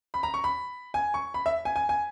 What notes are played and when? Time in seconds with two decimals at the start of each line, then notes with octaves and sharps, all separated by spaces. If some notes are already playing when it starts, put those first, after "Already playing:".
0.14 B5
0.23 A#5
0.34 C#6
0.44 B5
0.94 G#5
1.14 C#6
1.34 B5
1.46 E5
1.65 G#5
1.76 G#5
1.89 G#5